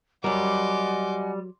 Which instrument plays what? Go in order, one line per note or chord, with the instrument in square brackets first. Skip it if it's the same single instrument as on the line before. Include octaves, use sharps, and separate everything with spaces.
[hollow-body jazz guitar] F#3 A#4 [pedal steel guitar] G3 [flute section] D#5 F#5 G#5 [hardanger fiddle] C6 D6